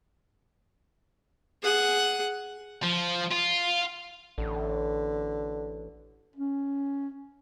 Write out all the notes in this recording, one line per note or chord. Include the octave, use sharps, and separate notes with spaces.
G#4 F#5
F3
F4
A1 D3
C#4